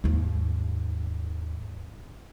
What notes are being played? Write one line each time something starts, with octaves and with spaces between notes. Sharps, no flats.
D#2 G#2